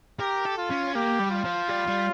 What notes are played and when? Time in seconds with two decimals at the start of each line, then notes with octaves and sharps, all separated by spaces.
0.20 G4 A#4
0.46 A4
0.58 F4
0.70 C#4
0.95 A#3 G4
1.20 G3
1.31 F4
1.44 F3
1.69 G3
1.87 G3